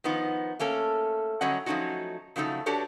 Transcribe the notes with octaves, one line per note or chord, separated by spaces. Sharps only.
D#3 F3 B3 D#4
A3 A#3 C#4 A4
D3 F#3 G3 C#4 D#5 F#5
F3 F#3 A3 C#4 D#4 F#4
C#3 F3 F#3 A3 D#4 A4
D4 F#4 G4 A4 B4 C#5